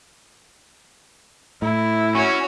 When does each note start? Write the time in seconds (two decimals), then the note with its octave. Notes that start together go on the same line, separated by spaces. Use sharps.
1.62 A2 E4
2.15 C#4 F#4 C#5